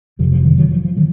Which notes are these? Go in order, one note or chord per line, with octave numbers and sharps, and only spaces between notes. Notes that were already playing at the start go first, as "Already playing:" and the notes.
F1 F2 C3 F3
F3
D#3 F#3
D#3 F#3
F3
F3
D#3 F#3